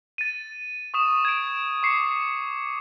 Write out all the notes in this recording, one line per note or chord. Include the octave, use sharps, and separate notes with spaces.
A6 D#7
C#6 D#6 E7
G#6 D7
C#6 D6 C7 C#7